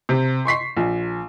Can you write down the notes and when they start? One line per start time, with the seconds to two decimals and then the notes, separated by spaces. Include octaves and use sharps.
0.09 C3
0.45 C6 C#6 B6 C7
0.77 A#1